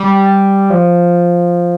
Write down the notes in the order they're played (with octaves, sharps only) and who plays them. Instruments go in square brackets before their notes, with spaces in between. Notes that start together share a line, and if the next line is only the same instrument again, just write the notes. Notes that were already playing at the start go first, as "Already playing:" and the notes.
Already playing: [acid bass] G3
F3